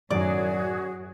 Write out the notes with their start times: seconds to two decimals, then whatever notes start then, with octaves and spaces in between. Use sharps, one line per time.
0.10 F#2 A2 D#3 F#3 F#4 G#4 C#5 D5